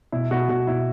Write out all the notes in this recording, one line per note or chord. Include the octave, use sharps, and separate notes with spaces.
B2 E4
B2 F#4
B2 F#4
B2 E4